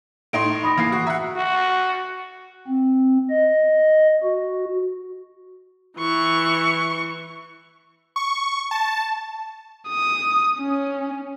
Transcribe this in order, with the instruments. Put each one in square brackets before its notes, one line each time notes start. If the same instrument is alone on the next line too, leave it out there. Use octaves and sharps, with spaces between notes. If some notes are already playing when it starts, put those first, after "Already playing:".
[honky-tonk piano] A2 D#4 C6 [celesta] D7
[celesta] B5 D#6 A#6
[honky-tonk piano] E3 A#3 C7
F#4
[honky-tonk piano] E5 F#5 [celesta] A#5
[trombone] F#4
[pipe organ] C4
D#5
F#4
[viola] E3 C#6
[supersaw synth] C#6
A5
[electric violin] D#6
C#4